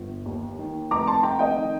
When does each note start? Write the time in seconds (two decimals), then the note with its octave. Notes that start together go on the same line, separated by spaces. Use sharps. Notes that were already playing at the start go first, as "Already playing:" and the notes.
Already playing: G1
0.26 D#2
0.59 D#3
0.91 F1 A#5 D6
1.07 A5 C6
1.23 F1 G5 A#5
1.39 D#5 G5
1.56 D#3